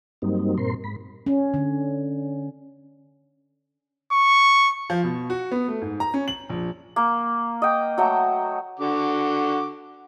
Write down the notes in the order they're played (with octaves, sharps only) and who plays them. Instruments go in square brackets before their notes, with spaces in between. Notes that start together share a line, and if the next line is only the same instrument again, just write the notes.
[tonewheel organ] G2 F#3 G3 A#3 C4 D#4
G2 A#2 C4 A#4 C6
G#2 B5
[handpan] C#4
D3
[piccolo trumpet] C#6
[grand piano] F3
B2
F#4
B3
A3
G#2
A#5
C#4
F#7
A#1
[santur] A#3
D#5 G5
F#3 A3 G5 A#5
[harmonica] D3 F#4 D6